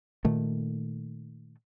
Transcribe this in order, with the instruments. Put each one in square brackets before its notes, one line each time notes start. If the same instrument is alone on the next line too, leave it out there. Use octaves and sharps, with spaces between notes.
[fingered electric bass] A#2 D#3 A3